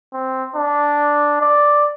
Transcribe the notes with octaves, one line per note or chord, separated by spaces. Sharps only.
C4
D4
D5